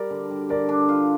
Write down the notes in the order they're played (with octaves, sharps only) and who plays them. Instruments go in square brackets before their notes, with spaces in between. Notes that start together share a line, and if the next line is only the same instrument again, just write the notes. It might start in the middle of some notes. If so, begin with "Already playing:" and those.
Already playing: [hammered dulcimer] G3 [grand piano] A#4 D5
[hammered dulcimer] D3
G3
[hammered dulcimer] D3 [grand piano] A#4 D5
[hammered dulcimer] D4
F4